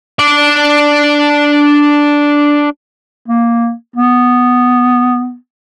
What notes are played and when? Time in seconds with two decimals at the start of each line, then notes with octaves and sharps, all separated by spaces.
0.19 D4 D5
3.28 A#3
3.96 B3